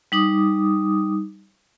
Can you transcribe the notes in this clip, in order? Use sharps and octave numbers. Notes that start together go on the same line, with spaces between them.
G3 D#4 D6 D#6